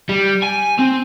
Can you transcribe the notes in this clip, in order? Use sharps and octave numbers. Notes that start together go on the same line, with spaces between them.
G3
G#5
C4